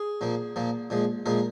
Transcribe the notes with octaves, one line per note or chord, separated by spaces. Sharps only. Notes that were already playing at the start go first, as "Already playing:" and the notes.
Already playing: G#4
A#2 F3 A#3
A#2 F3 A#3
A#2 F3 G#3
A#2 F3 G#3 A#4